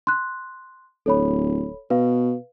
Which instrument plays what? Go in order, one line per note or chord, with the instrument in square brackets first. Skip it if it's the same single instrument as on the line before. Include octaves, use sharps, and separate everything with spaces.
[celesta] C6 F#6
[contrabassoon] D1 [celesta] A4 C#5 B5
[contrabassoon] B2 [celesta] B4 F5